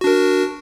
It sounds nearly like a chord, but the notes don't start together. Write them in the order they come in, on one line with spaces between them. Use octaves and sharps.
F#4 D4 A#4